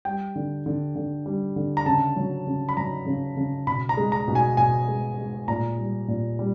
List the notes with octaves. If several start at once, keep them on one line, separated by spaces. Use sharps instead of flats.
G3 G5
D3
D3
D3
G3
D3
A#5
C#3 A5
F#3
C#3
B5
F#3 A#5
C#3
C#3
B2 B5
A#5
G#3
A#5
B2
G#5
B2 G#5
G#3
G#3
A#2 A#5
G3
A#2
G3